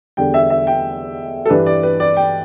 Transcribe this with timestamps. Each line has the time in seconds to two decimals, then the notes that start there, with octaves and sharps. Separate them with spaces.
0.17 E2 D3 G3 G5
0.34 E5
0.50 E5
0.67 G5
1.46 A4
1.50 G2 E3 G3 D4 B4
1.66 D5
1.83 B4
2.00 D5
2.17 G5